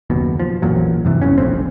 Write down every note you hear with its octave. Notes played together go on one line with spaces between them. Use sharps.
F#1 D#2 B2
F3
A1 E2 A#2 F#3
G2 C3 E3
F#1 B1 E2 C#4
E1 A#1 F2 C4